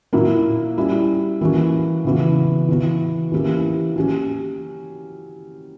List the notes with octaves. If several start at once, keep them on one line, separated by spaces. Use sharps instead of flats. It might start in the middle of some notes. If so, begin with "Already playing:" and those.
A#2 F#3 A#3 E4
G3 C#4 E4
E3 A#3 C#4 F#4
C#3 E3 B3 F#4
E3 B3 F#4
E3 A#3 C#4 E4 G4
F#3 C#4 G4